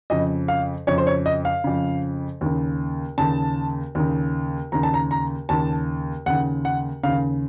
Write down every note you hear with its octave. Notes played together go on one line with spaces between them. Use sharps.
F2 C#3 D#5
F5
F2 C#3 C#5
C5
C#5
D#5
F5
F2 C#3
D#2 C#3
D#2 C#3 A5
D#2 C#3
D#2 C#3 A#5
A5
A#5
A#5
D#2 C#3 A5
D#2 C#3 F#5
F#5
D#2 C#3 F5